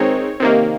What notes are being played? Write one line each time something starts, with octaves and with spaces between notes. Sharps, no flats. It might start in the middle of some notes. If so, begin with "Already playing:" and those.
Already playing: D#3 G#3 C4 D#4 C#5
C3 D#3 A#3